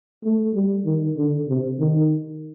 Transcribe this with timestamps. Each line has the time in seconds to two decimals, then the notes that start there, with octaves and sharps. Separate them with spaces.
0.24 A3
0.54 G3
0.85 D#3
1.16 D3
1.48 C3
1.79 D#3